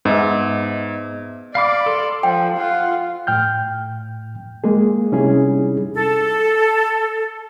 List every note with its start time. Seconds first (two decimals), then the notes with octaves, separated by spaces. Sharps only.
0.05 G#2 B3 D#5 E5
1.55 D5 F5 B5 D6
1.86 A4 C6
2.23 F3 C5 G5
2.56 F4 F#5
3.27 A2 G5 F6 G6
4.64 G#3 A#3 G#4
5.12 C3 G3 C#4 D#4 E4 G#4
5.95 A4